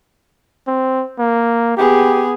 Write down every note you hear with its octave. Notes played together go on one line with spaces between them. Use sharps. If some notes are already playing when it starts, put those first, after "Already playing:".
C4
A#3
B3 G4 G#4